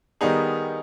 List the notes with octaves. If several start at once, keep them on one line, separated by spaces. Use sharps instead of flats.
D#3 G3 B3 D#4 G#4